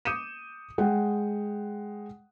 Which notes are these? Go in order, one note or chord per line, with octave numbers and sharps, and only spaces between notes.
D6 D#6 G6 C#7 D#7 E7
G#3 F#5 G5